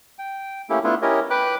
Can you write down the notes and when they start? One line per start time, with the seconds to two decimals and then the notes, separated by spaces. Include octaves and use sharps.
0.19 G5
0.70 A3 A#3 C#4 E4 G4 A4
0.84 A3 B3 D4 E4 F4 A4
1.02 C#4 E4 G4 A#4 C#5 D#5
1.30 B4 G5 B5 D6 F#6